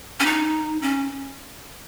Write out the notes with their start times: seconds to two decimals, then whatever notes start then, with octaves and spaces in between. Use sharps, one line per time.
0.20 C#4
0.26 D#4
0.82 C#4